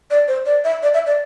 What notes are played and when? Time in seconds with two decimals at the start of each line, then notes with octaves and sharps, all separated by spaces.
0.11 D5
0.28 C5
0.46 D5
0.64 E5
0.83 D5
0.94 E5
1.06 D5